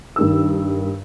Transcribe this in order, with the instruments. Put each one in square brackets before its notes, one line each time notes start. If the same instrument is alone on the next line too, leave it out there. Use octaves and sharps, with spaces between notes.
[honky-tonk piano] G2 D#3 E6